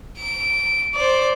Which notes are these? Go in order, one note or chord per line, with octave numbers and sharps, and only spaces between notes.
D7
C5 D5